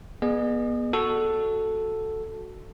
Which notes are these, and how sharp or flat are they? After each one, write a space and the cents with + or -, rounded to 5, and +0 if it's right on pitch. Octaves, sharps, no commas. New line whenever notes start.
B3 -30 G#4 +0 D#5 -45
F#4 +0 A4 +0